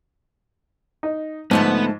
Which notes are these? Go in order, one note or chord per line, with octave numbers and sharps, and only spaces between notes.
D#4
G#2 D3 F3 A3 B3 A5